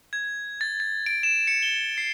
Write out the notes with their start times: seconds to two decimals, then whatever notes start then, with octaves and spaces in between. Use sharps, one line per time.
0.13 G#6
0.61 A6
0.80 A6
1.06 D7
1.23 E7
1.47 C#7
1.63 G7
1.98 C7